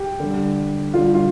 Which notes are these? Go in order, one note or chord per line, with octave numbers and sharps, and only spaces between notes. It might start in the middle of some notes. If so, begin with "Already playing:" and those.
Already playing: G4
D3 G3
D3 G3 F4
F4